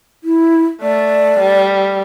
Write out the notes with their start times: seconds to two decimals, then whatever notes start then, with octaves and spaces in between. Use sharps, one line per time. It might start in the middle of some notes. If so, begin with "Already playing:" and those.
0.24 E4
0.82 A3 D5
1.40 G3